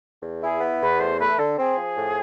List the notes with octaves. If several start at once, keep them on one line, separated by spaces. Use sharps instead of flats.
E2
E4 G#4
B3
E2 B4
A3 C5
A3 B4
D3 A4
C4 G#4
F3
A2